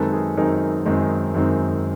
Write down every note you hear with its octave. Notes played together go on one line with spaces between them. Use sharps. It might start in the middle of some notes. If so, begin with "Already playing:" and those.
Already playing: F#2 D#3 G#3 C4 D#4 A4 B4
G#4 A#4
F#2 D#3 G#3 C4 D#4 G#4 A#4
F#2 D#3 G#3 C4 D#4
F#2 D#3 G#3 C4 D#4